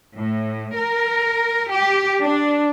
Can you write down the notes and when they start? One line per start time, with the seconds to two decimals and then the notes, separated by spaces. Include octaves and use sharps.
0.16 A2
0.75 A#4
1.70 G4
2.22 D4